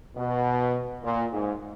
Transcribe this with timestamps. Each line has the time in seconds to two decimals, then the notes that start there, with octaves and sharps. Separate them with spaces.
0.16 B2
1.03 A#2
1.32 G#2